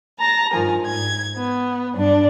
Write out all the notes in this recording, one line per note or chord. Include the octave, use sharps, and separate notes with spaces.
A5 A#5 A#6
G2 D#3 F3 G#5
G#2 G#6
B3
G2 D4